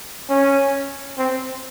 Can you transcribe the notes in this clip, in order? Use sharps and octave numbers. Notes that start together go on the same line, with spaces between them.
C#4
C4